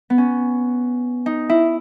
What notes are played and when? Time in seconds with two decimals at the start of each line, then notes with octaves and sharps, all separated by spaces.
0.10 B3
0.18 C#4
1.26 D#4
1.49 E4